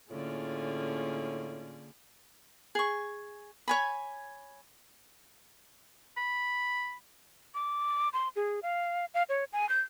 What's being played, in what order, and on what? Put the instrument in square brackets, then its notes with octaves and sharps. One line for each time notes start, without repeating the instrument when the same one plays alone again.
[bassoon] A2 [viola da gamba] D3 A#3 G#4 [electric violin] C#4 F4
[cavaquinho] G#4 C#6
C#5 G#5 B5
[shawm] B5
[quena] D6
C6
G#4
F5
F5
C#5
G#5
G6